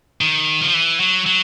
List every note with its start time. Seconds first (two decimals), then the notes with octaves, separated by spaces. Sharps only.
0.21 D#3
0.61 F3
0.74 E3
1.00 F#3
1.26 F#3